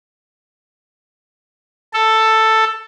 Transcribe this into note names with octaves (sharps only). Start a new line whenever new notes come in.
A4